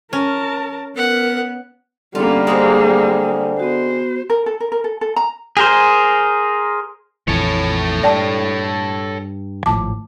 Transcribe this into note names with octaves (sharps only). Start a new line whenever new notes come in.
C#4 A#4 A5
B3 A#4 F#5
D3 G3 A#3 B3 C#4 F4 A4
G#3 C4 G#4 C5 G5
B3 F#4 C5
A#4
A4
A#4
A#4
A4
A4
A#5
G#4 A#4 C5
A#1 F2 E3 A4 C#5
G2 D5 G5 A5
G#1 A2 F3 A5 D6